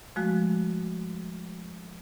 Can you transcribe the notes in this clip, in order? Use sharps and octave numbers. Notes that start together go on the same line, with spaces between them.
F3 G#3 A3 F#4